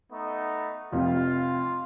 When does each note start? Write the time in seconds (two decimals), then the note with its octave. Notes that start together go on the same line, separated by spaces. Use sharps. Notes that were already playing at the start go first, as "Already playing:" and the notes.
0.11 A3 B3 D#4
0.93 F1 F2 C3 F4